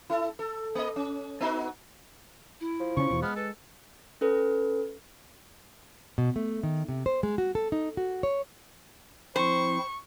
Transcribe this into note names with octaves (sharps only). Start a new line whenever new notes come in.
E4 A4
A4
A#3 D#5
C#4
B3 D#4 F#4
E4
F3
C#3 C#4 C#6
E2 B2
G#3 B3 F6
A4 B4
C#4 A4 B4
B2
A3
D#3
C3
C5
G#3
F#4
A4
D#4
F#4
C#5
F3 C4 E4 C5 C#6